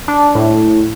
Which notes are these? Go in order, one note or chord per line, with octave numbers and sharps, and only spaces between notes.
D4
A2